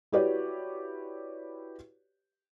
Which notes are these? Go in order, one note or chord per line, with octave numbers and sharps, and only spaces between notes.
E4 F#4 G4 B4 C#5 D5